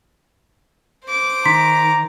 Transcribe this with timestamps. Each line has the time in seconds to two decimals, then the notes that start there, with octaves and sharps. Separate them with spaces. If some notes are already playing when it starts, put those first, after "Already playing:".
1.05 C5 D6
1.45 D#3 A#5 C6 B6